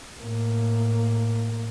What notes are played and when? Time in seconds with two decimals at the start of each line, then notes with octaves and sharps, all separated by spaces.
0.20 A2 A#3